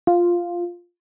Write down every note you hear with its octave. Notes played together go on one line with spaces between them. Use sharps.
F4